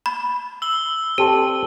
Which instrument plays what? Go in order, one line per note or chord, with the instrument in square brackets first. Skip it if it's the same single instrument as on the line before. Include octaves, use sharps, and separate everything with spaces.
[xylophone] B5
[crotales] E6 G7
[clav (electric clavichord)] C4 A4 D5 [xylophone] G4